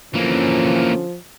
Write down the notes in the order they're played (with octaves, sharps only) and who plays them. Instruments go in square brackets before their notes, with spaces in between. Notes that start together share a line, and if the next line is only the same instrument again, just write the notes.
[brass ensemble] D3 C#4 [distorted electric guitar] E3 A#3 [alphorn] F3